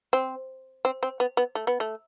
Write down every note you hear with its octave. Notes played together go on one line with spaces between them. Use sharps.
C4
C4
C4
B3
B3
A3
B3
A3